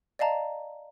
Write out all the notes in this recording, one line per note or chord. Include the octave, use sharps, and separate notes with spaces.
D5 D#5 F5 A5 A#5